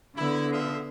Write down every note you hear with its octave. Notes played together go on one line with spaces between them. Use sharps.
D3 B3 E4
F3 G#4 E5